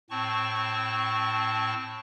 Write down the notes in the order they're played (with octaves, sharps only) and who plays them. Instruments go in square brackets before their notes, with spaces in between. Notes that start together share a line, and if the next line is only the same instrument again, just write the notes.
[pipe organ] A2 C4 A5 C#6